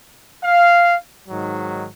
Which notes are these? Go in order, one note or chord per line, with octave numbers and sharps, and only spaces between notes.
F5
G#2 D#3 F#3